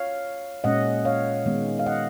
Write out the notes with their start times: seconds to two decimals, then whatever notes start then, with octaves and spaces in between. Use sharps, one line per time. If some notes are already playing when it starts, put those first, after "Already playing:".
Already playing: C#5 F5
0.64 A#2 G#3 C#4 D#5 F#5
1.05 C#5 F5
1.46 D#3 G#3 B3
1.79 F5
1.86 D#5 F#5